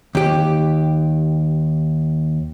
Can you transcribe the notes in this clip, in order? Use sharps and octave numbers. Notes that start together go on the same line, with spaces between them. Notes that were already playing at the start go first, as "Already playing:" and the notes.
D#2 G4